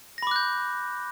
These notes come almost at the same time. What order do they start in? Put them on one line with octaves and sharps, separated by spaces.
A#6 B5 D6 F#6 G6